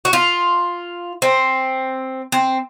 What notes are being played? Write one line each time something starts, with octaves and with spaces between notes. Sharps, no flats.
F#4
F4
C4
C4